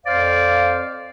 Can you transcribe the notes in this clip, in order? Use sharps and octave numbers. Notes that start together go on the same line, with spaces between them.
F2 C5 D5 F5